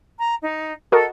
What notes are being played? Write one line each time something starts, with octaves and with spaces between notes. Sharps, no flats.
A#5
D#4
F#4 A4 A#4 D#5